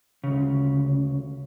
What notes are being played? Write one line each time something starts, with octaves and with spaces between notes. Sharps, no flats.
D2 C#3